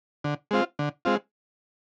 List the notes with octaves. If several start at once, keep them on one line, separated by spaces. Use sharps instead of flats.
D3
G#3 C4 F4
D3
G#3 C4 F4